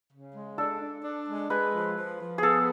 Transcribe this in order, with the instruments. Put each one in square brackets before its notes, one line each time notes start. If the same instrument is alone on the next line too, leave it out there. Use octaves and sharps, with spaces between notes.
[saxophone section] C#3
G#3
[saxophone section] D4 [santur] A4
[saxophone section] D4
D4
G#3
[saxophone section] G#3 [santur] B4
[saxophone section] F3
F3
F3
[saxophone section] B3 [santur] G#4 A4